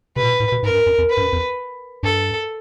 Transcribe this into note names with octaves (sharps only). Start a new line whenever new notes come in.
C3 B4
A#2
B2
A2
B2
G#2 A#4
F#2
G2
F#2
F2
B4
G2
F#2
F2
G2 A4